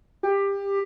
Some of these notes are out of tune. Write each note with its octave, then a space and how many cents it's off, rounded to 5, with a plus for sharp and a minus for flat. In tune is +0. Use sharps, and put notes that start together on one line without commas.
G4 +20